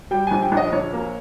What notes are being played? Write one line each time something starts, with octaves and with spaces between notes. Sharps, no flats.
G3 G5
A#1 G#5
G5
A#1
D#5
A#1 C#5
A#3